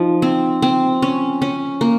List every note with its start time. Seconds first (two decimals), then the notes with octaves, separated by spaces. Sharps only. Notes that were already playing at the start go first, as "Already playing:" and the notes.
Already playing: F3 D#4
0.22 C4
0.62 C4
1.02 C#4
1.42 C#4
1.81 A#3